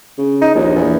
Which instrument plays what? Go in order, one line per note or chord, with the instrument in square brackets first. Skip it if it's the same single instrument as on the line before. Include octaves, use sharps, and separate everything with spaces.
[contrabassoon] C#3
[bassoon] D#4
[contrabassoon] A#1 [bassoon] D#2
[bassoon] E2